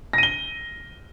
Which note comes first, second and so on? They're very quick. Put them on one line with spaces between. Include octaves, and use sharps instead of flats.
A#6 D#7 G7